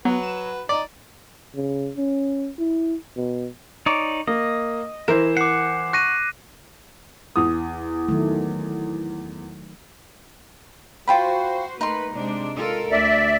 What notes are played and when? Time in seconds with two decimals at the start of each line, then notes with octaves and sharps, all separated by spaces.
0.05 F#3 B3 F#4 B4
0.23 E7
0.69 D#4 D5
1.56 C#3
1.97 C#4
2.58 E4
3.16 B2
3.86 D#4 C#5 D5
4.28 A#3 D#5
5.08 E3 E4 A#4 C5 E7
5.37 F#5 D6 C7
5.93 C#6 F#6 A#6 D#7
7.36 E2 D#6
8.09 D#3 F#3 A3
11.08 F4 F#4 C5 G5 B5
11.81 A3 A#3 D#4 B4 C6
12.14 C3 G#3 D4
12.56 F4 A4 A#4
12.92 D2 D5 E5